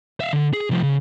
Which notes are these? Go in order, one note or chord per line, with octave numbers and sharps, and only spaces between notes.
E5 F5
D3
G#4
C2 F3
C#3